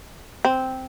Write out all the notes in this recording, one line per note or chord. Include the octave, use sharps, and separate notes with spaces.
C4